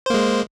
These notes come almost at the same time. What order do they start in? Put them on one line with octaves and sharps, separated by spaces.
C5 A#3 G#3